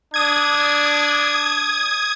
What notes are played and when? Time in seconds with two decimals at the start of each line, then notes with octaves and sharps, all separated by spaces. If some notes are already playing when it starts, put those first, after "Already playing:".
0.14 D4 D#6 G#6